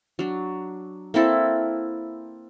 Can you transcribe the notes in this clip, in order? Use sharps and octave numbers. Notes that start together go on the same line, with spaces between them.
F#3 D4
A#3 C4 E4 A4